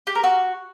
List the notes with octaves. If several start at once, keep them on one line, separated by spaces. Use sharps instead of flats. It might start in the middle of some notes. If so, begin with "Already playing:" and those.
G4
A#4
F#4